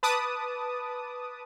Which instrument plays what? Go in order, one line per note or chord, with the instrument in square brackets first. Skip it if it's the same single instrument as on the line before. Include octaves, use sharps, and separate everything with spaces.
[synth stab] B4 A5 D6 D#6